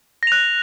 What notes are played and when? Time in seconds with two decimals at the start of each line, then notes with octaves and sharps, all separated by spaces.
0.23 A#6
0.27 F7
0.32 F#6